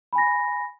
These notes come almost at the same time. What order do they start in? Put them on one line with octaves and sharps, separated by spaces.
B5 G#5 A#6